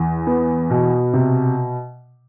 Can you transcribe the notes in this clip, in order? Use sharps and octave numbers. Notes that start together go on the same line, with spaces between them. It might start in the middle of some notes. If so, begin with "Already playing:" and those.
Already playing: E2
B3
B2
C3